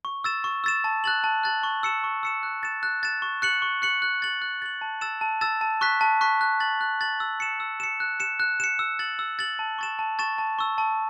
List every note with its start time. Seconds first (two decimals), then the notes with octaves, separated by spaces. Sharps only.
0.05 C#6
0.24 E6 A6 E7
0.44 C#6
0.64 E6 A6 E7
0.84 A5
1.04 F#6 A6 F#7
1.24 A5
1.43 F#6 A6 F#7
1.63 C#6
1.83 E6 C#7 E7
2.04 C#6
2.23 E6 C#7 E7
2.43 F#6
2.63 A6 E7
2.83 F#6
3.03 A6 E7
3.22 C#6
3.42 F#6 C#7 F#7
3.62 C#6
3.82 F#6 C#7 F#7
4.02 F#6
4.22 A6 F#7
4.42 F#6
4.62 A6 F#7
4.81 A5
5.01 E6 A6 E7
5.21 A5
5.41 E6 A6 E7
5.61 A5
5.81 C#6 F#6 B6
6.01 A5
6.21 C#6 F#6 B6
6.41 F#6
6.60 A6 F#7
6.81 F#6
7.01 A6 F#7
7.20 E6
7.40 C#7 E7
7.60 E6
7.80 C#7 E7
8.00 F#6
8.20 C#7 E7
8.40 F#6
8.60 C#7 E7
8.79 E6
8.99 A6 F#7
9.19 E6
9.39 A6 F#7
9.59 A5
9.78 C#6 A6 E7
9.99 A5
10.19 C#6 A6 E7
10.38 A5
10.59 C#6 E6
10.78 A5